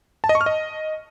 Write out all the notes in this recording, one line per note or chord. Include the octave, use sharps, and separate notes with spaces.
A5
D#5
C#6
F6
D#5